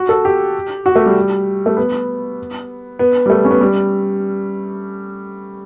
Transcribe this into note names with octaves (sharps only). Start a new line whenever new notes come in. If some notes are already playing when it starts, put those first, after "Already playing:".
Already playing: F#4
A4
G4
F#4
A3
G3
A3
B3
B3
G3
A3
C#4
B3
G3